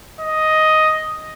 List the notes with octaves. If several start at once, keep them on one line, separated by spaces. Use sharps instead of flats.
D#5